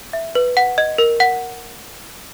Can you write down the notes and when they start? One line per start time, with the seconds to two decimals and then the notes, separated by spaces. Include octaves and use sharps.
0.13 E5
0.35 B4
0.57 F#5
0.78 D#5
0.98 A#4
1.20 F#5